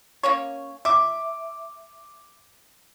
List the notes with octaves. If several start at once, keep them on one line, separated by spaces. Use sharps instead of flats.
A#3 C#4 C#5
E5 D6